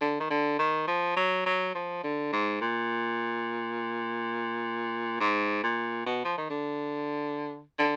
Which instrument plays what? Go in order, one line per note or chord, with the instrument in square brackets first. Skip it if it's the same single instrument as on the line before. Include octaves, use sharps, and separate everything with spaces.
[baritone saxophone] D3
D#3
D3
D#3
F3
F#3
F#3
F3
D3
G#2
A#2
G#2
A#2
B2
F3
D#3
D3
D3